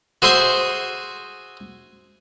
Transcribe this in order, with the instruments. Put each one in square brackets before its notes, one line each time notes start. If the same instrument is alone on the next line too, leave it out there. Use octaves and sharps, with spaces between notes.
[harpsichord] F#4 G#4 C5 E5 C6